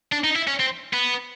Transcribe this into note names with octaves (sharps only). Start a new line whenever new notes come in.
D4
D#4
E4
C#4
C4
B3